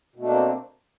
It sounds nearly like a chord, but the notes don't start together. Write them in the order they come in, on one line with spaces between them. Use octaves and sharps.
B2 A3 D4 A#3 C4